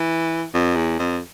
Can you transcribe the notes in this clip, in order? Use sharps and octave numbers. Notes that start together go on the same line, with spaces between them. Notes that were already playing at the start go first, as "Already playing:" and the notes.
Already playing: E3
F2
E2
F2